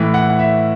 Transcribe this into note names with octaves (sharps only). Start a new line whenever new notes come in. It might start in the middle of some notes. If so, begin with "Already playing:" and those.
Already playing: A2 E3
F#5
F#5
E5